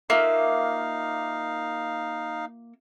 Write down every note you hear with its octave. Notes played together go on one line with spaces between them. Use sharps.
A#3 D#4 F4 E5 F5